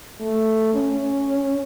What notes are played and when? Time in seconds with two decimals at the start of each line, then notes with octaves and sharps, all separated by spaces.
0.21 A3
0.75 C#4